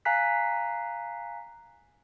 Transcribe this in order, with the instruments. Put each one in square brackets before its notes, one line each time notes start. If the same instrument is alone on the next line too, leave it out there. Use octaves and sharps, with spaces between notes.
[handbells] F5 G#5 A#5 F#6 B6